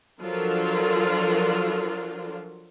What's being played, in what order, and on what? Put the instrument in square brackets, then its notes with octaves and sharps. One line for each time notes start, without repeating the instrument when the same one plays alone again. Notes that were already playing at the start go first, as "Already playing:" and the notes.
[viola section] F3 F#3 D4 F4 A4 A#4